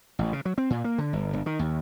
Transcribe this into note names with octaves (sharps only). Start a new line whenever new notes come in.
A1
C#3
F#3
C4
A#2
A#3
D3
G1
G1
D#3
D#2